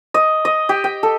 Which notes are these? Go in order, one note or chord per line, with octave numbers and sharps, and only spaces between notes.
D#5
D#5
G4
G5
A4